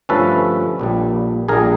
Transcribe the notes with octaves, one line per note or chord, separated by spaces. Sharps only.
G2 D3 F3 A3 C#4 A4 B4
A#1 A#2 G3
A#1 A#2 G3 G#4 A#4